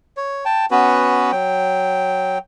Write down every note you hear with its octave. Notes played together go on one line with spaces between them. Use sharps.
C#5
G5 A5
B3 C#4 F#4 B4
F#3 G5